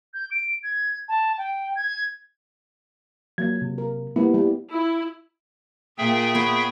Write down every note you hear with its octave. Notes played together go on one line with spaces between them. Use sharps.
G6
D7
G#6
A5
G5
G#6
F#3 A#3 G#6
C3
A#4
G3 A#3 B3 E4
G3
E4
A#2 G#4 E5 G5
B3 C#5